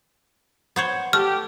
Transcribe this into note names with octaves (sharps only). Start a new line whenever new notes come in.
B3 C5 C#5
A3 G4 F6